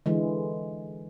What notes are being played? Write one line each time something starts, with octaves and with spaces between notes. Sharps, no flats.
D3 E3 G#3